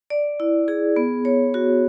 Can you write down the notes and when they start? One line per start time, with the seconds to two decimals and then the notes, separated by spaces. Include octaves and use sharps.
0.10 D5
0.40 E4
0.68 G#4
0.96 B3
1.25 C#5
1.54 F#4